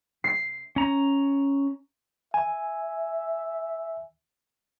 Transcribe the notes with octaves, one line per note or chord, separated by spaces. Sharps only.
C7
C#4 A#5
E5 G#5